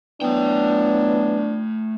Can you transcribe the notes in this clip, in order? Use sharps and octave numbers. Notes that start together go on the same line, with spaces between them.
E3 F#3 A3 B3 D4 G5